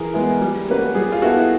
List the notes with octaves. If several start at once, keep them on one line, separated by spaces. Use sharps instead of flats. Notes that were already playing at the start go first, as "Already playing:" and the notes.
Already playing: E3 G#4 A#4
G#3 B3 E4
G3
A#3 C#4 F#4 B4
G3 G#4
F4
B3 E4 F#4 A4